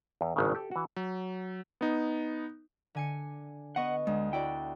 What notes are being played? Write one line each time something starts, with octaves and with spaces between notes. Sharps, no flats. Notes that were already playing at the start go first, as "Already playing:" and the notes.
E2
G#1 G2 C#3
G4 A4
E3 F#4
F#3
B3 D#4
D3 G#5 C#7
B3 D#5 F#5 C#6
D2 G#3
E4 F#4 D5 G5